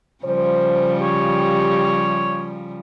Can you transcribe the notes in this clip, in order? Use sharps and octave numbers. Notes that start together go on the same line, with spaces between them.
C#3 F3 G3 C5
G4 C#5